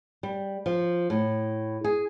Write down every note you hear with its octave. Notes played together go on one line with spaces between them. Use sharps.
G3
F3
A2
G#4